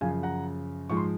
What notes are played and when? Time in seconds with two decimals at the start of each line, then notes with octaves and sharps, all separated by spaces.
0.01 F#2 C#3 F3 F5 G#5
0.23 F#5 A#5
0.89 G#2 F3 G#3 C#6
0.97 C6